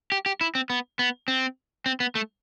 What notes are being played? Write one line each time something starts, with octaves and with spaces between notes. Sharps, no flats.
G4
G4
E4
C4
B3
B3
C4
C4
B3
A3